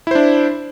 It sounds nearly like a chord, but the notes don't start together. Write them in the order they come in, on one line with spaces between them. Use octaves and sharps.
E4 C5 D4